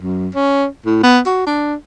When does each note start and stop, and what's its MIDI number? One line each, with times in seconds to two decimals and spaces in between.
0.02 0.28 42
0.34 0.66 61
0.85 1.01 45
1.03 1.19 59
1.26 1.46 66
1.46 1.74 62